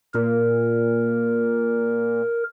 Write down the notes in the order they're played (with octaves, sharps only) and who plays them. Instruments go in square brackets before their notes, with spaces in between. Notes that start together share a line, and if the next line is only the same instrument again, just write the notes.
[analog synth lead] A#2 [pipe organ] A#4